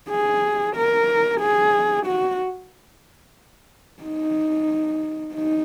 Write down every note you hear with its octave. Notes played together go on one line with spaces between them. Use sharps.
G#4
A#4
G#4
F#4
D#4
D#4